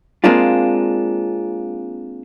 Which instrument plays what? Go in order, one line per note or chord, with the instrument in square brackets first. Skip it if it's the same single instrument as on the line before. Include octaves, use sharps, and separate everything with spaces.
[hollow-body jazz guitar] G#3 A#3 C4 D4 F4